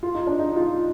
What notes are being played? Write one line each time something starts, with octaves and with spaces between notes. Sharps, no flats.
F4
D#4
D4
D#4
F4